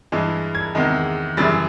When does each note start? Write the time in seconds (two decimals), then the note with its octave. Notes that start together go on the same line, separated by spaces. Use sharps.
0.12 G2 E3 G#3
0.55 G#6
0.75 E2 C3 D#3 G#3
1.37 F#2 C#3 E3 G3 A6